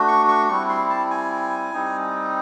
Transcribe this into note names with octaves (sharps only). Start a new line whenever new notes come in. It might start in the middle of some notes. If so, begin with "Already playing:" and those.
Already playing: A3 D4 F#4
C#6
C#6
G3 C4 E4 C#6
C6
A5
G#5
G3 C4 D#4